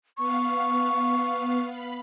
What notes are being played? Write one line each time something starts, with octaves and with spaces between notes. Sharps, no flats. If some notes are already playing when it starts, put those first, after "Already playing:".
B3 F5 C#6
B5